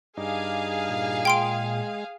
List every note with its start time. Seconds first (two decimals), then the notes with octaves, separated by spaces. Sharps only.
0.17 G2 D#4 G#4 F5 D6
0.89 A#2
1.25 G#3 G5 C6 D7